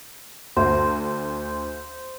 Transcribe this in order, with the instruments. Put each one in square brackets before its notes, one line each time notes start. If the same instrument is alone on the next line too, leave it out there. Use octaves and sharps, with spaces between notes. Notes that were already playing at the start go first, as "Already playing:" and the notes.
[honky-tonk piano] D2 [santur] C5